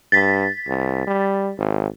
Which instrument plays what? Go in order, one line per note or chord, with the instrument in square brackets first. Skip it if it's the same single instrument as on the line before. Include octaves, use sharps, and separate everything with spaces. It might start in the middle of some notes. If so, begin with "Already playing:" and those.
[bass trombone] G2 [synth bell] A6 B6
[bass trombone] C2
G3
G#1